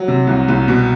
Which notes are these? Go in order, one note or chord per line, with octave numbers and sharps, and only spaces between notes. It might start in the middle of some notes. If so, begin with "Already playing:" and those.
Already playing: F#3
C3
C2
C2
B2